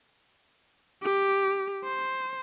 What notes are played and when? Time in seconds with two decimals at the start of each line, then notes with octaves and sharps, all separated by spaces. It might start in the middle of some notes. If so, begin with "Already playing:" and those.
1.03 G4
1.84 C5